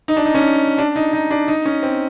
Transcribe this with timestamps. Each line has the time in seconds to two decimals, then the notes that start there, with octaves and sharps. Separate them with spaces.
0.08 D#4
0.17 D4
0.25 D#4
0.35 C#4
0.78 D4
0.96 D#4
1.13 D#4
1.31 D4
1.48 D#4
1.65 C#4
1.83 C4